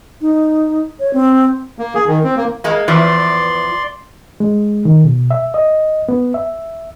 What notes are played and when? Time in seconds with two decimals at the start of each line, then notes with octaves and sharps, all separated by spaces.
0.21 D#4
1.00 C#5
1.13 C4
1.79 A#3
1.95 G#4
2.08 D#3
2.24 C4
2.37 A#3
2.64 G#3 A#3
2.88 E2 E3 F3 D5 C6
4.40 G#3
4.85 D#3
5.04 B2
5.31 E5
5.54 D#5
6.09 B3
6.34 E5